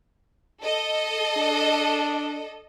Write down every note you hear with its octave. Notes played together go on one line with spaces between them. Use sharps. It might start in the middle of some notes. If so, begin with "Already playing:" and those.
A4 D#5
D4